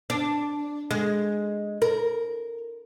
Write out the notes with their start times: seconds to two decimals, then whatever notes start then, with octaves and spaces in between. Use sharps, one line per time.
0.10 D4
0.91 G#3
1.82 A#4